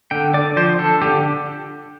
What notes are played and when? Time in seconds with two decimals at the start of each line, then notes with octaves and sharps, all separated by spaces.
0.11 D3 G5
0.34 D3 D5
0.57 F3 C5
0.79 D4 A4
1.02 D3 G4